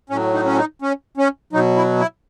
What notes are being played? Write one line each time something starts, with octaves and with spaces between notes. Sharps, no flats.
A2 F#3 C#4
D#4
C#4
D#4
C#4
C#4
B2 F#3 D#4
E4
E4